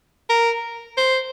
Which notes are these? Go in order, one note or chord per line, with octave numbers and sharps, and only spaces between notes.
A#4
C5